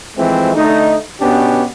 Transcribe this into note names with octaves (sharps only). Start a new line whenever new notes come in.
E3 F3 G#3 A3 C4
D3 A3 D#4
B2 B3 C#4 D4 G4